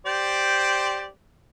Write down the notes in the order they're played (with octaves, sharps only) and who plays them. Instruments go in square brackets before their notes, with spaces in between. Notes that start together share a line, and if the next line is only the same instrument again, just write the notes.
[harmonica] G4 C5 D5